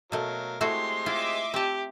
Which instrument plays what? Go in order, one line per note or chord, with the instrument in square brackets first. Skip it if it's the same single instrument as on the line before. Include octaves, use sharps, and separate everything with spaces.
[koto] B2 A3 [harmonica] F#3 A#4 F5
[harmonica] G#3 C4 G4 [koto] A3 E4 F#4 [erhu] C6
[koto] E4 F4 [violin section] D#5 E5 D6
[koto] C4 A5 [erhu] G4